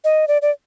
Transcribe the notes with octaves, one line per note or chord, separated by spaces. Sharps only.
D#5
D5
D5